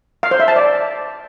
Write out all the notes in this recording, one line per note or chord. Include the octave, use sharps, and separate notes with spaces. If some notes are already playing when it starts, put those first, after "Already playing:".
F5
C5
E5
A5
D5